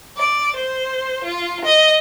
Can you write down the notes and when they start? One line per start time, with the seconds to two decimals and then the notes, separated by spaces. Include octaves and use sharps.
0.16 D5
0.55 C5
1.22 F4
1.65 D#5